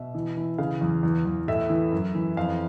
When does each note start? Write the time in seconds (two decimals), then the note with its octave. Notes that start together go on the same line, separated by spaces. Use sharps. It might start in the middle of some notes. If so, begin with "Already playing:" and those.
Already playing: B2 E5
0.15 E3
0.37 E3
0.58 C#3 F5
0.81 E2
1.03 E2
1.25 E2
1.48 A2 E5
1.70 E3
1.92 F#2
2.15 E3
2.37 F2 F5